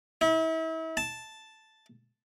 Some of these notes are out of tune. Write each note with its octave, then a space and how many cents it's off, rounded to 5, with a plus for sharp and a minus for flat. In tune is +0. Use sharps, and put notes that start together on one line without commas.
E4 -35
A5 +0